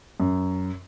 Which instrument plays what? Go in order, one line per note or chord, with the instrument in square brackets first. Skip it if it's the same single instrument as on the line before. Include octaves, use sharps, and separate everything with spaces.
[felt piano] F#2